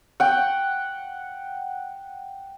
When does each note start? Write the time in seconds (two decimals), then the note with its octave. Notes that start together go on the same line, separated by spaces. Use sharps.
0.20 F#5 G5